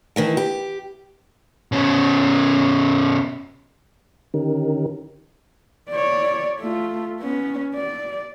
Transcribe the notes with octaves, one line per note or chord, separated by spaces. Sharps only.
D#3 E3 A3
G4
B2 C#4
D3 D#3 C#4 D#4 G4 A#4
C#5 D5
A3 F4
B3 C#4
D5